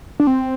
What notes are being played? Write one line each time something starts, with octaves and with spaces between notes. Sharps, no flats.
D4
C4